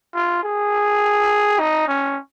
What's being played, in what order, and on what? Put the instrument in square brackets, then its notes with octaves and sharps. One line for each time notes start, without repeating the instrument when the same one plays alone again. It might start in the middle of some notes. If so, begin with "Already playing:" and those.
[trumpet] F4
G#4
D#4
C#4